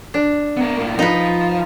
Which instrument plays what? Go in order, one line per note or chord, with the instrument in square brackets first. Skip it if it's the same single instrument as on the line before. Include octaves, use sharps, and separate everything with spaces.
[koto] D4
[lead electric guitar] B3 A#4
A2 A#3
[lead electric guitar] F3 [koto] D#4 B4